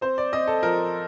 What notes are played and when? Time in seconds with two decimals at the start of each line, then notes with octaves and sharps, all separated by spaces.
0.01 C4 C5
0.18 D5
0.32 C4 D#5
0.47 A4
0.63 F3 A#4